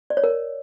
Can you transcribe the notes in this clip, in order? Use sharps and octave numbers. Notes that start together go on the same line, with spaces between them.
D5
C#5
A#4